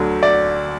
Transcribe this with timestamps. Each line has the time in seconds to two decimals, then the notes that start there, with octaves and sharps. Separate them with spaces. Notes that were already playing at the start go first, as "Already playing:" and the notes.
Already playing: D2 D3 F#3
0.23 D5